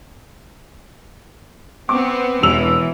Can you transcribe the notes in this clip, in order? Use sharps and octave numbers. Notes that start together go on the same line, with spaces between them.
B3 C4 D6
E1 E3 E6 F7